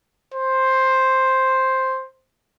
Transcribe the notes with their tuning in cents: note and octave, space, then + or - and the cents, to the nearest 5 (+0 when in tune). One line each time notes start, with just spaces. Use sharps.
C5 +5